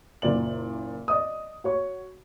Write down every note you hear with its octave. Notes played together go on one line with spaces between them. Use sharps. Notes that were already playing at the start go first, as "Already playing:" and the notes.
F#1 A#2 D5 F#7
D5 D#5 D#6
F#4 C#5 C#6